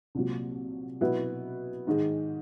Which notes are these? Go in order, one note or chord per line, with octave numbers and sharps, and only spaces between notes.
C2 A#2 F#3
B2 F#3 B3 E4
G#2 D#3 G#3